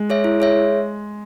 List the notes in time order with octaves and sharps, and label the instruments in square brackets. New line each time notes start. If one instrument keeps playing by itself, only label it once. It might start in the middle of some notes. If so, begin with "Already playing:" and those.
Already playing: [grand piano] G#3
[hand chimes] G#4 C#5 E5
E4
G#4 C#5 E5